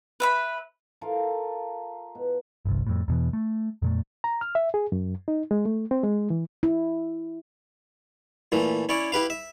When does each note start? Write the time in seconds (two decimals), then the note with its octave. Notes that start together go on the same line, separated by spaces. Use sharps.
0.20 B4 E5 B5
1.01 F4 A4 A#4 F5
2.15 B2
2.65 G1 C2
2.87 F2 A2
3.08 E2 B2 E3
3.33 A3
3.82 F2 A#2 A3
4.24 A#5
4.41 F6
4.55 E5
4.74 G#4
4.92 F#2
5.28 D#4
5.51 G#3
5.65 A3
5.91 C4
6.03 G#3
6.30 E3
6.63 E4
8.52 A#2 E3 A3
8.89 C#4 E4 C#5 D5
9.12 E4 G4 B4 F5
9.30 E5